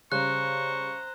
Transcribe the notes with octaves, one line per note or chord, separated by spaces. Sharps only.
C#3 G3 C5 A#5 C#6 F#6